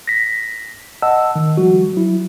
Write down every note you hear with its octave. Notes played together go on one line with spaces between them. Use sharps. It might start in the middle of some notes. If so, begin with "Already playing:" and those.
A#6 B6
D#5 F#5 A5 E6
D#3
F3 G3 F#4
F#3 E4